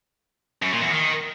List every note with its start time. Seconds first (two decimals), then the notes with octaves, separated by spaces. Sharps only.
0.62 F#2
0.72 A#2
0.81 E2
0.91 D#3